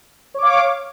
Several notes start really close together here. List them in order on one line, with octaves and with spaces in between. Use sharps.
C#5 D6 F5